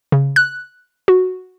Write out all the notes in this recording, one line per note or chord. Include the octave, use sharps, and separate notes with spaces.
C#3
F#6
F#4